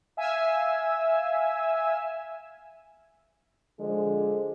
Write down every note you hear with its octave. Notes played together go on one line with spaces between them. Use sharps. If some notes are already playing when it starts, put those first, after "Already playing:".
E5 F5 G#5 E6
D3 F3 G#3